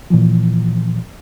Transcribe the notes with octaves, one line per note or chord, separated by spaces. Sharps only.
A#2 E3 F3